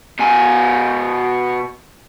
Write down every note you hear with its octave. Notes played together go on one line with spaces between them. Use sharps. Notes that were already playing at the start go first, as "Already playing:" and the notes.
B2 G#5